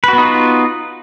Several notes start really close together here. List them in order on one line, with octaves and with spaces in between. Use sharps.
B4 F#4 B3 D#4 F4